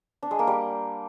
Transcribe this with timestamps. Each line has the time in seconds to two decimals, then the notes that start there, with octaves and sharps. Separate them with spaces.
0.23 D4
0.31 G#3
0.39 A#3
0.47 G3